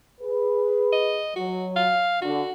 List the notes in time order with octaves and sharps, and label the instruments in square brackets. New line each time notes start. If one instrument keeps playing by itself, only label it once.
[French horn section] G#4 B4
[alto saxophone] D#5
[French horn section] F#3 [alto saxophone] F#4
[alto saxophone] F5
[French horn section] D3 [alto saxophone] F#4